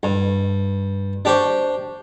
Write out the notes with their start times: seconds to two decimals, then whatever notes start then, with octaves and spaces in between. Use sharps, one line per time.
0.03 G2
1.25 D4 G4 C5 C#6